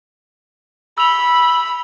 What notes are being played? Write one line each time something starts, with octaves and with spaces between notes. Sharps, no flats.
B5 E6 F7